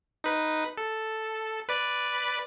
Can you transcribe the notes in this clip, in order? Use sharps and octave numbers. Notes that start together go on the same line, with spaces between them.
D#4 B4
A4
B4 D5